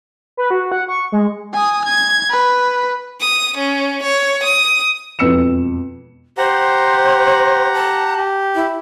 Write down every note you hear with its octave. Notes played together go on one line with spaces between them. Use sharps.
B4
F#4
F#5
C#6
G#3
G#5 D#6
G#6
B4
D#6
C#4
C#5
D#6
E1 F2 B4 E6 C#7 E7
G4 C5 F#5 A#5
A5
G4
E4